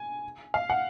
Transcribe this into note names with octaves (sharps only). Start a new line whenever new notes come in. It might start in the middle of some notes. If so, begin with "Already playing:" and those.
Already playing: G#5
F5
F#5